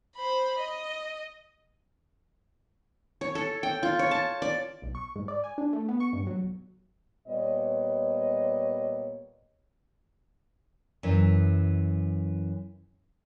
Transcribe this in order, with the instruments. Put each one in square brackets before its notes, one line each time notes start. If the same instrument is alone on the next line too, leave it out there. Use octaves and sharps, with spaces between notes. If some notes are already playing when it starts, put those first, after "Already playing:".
[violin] C5 B5
D#5
[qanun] C#5
A4
G5
F4
C#5
A5
D5
[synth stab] B1
C#6
G#2
D5
G#5
D4
A3
B3
C#6
G2
F#3
B1
[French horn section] A#2 G3 B3 C#5 D#5
[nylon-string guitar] F#2 E3